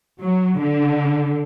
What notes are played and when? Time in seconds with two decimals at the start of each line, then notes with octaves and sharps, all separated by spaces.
0.19 F#3
0.59 D3